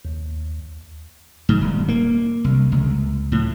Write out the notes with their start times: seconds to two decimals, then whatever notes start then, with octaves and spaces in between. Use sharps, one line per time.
0.05 D#2
1.49 G#2
1.61 D#1
1.88 A#3
2.44 C2
2.72 C#2
3.32 A2